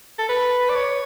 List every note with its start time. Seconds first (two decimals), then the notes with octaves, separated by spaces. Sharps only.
0.19 A4
0.29 B4
0.69 D5
0.75 C#5